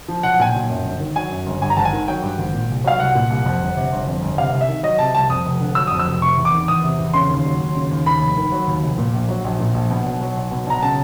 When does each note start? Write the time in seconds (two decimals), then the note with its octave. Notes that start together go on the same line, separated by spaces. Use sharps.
0.08 F3
0.23 B1 F#5
0.39 A#2 G#5
0.46 G5
0.54 B1
0.69 F#2
0.85 G1
1.00 D#3
1.16 F#3 G#5
1.31 F#2
1.46 G1
1.62 G2 G#5
1.70 A#5
1.77 G#1 A5
1.85 G#5
1.93 D#3
2.08 F#3 G5
2.22 G2
2.38 G#1
2.54 A#2
2.68 C2
2.84 F#3 F5
3.00 C2 F#5
3.15 A#2
3.30 C2
3.46 F2
3.62 G1
3.77 C3
3.92 G1
4.07 F2
4.22 G1
4.38 C3 F5
4.52 C2
4.61 E5
4.68 D#3
4.83 F#3 D#5
4.99 C3 A5
5.15 C2 A5
5.29 F2 D#6
5.46 F1
5.60 D3
5.75 F#3 E6
5.87 F2 D#6
5.99 E6
6.06 F1
6.22 C3 C#6
6.37 E2
6.45 D6
6.53 D#3
6.68 E2 D#6
6.83 C3
6.99 E2
7.14 C#3 C6
7.29 D#2
7.45 F#3
7.60 D#2
7.75 C#3
7.91 D#2
8.06 D#2 B5
8.21 F1
8.37 D#3
8.52 F#3
8.67 D#2
8.83 F1
8.98 A#2
9.13 A#1
9.29 F#3
9.44 A#1
9.60 A#2
9.74 A#1
9.90 B2
10.06 B1
10.21 F#3
10.37 B1
10.51 B2
10.66 B1 A#5
10.83 C#3 A5